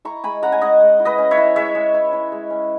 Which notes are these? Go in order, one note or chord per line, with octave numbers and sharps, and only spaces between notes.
E4 A#5 C#6
G#3 G#5 B5
C#4 F#5 A#5
G#5
G#3 D#5 F#5
G#3
E4
B4 D#5
C#4
C#5 E5
E4
G#3 C#5 E5
G#3
E4
E4
G#3
C#4